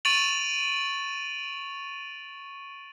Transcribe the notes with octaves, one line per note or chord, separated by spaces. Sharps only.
C#6 A6 D7 D#7 F7 F#7